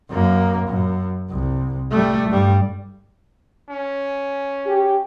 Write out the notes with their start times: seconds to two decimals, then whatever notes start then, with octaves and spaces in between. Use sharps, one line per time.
0.10 F#2 A#3
0.68 F#2
1.30 C2
1.91 G3 A3
2.30 G2 G3
3.69 C#4
4.66 G4